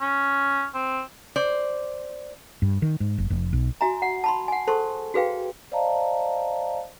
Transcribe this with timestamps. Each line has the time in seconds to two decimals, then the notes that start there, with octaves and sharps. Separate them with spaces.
0.01 C#4
0.74 C4
1.36 C5 D5
2.62 G2
2.82 D#3
3.00 G#2
3.18 F#1
3.30 F1
3.53 B1
3.81 F#4 E5 G#5 A#5
4.02 F#5
4.24 A5 B5 C6
4.48 F#5 G#5
4.67 G#4 A4 C5 A5 C6 C#6
5.14 F#4 G#4 B4 F5 G5
5.71 C5 D5 D#5 F5 A5 A#5